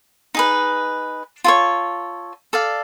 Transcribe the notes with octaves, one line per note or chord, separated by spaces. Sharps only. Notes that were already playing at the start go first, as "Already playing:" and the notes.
D#4 G#4 B4
F4 A4 C#5
A4 D5 F5